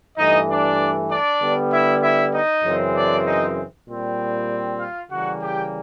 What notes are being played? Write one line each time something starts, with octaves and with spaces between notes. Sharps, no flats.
G2 E3 A3 D#4 D#5
D4 D5
D4 D5
D3 G3 B3
E4 E5
E4 E5
D#4 D#5
F#2 C#3 E3 G#3 C4
D4 D5
D#4 D#5
A#2 G3 C4
F4 F5
C#3 E3 G3 A#3 F#4 F#5
G4 G5